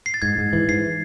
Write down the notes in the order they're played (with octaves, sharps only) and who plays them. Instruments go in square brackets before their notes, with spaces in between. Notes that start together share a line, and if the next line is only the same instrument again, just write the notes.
[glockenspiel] C7
A6
[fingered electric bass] G#2 [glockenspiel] G#6
[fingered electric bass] G#2
E3
[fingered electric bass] G#2 [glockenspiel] C7